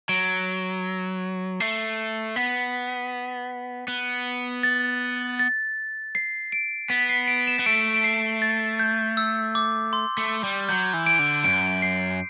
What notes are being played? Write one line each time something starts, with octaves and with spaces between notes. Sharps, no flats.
F#3 D7
A3 C7
B3 B6
B3
A6
A6
C7
D7
B3 B6
C7
D7
E7
B3
A3 D7
D7
C7
A6
G6
E6
D6
C6
A3
G3
F#3 G6
E3
D7
D3
F#2 D7
C7